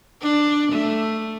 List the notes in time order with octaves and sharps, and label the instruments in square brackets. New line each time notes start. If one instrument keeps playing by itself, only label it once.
[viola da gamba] D4
A3